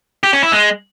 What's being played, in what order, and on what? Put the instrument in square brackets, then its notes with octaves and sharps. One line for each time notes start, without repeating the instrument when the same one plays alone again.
[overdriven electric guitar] G4
C#4
E4
G#3